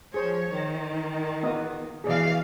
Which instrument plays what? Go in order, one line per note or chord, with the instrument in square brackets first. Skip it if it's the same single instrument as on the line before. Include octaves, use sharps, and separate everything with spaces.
[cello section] F3 C#5 [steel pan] G#4 C5
[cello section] D#3
[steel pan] A#3 B3 D#5
[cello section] B2 E3 F5 [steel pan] G#4 D5